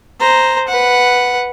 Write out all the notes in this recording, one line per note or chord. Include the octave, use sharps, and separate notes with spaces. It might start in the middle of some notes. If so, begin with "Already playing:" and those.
C5 A#5
B4 F#5